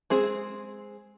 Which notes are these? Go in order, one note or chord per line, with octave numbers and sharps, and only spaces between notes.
G#3 C4 G#4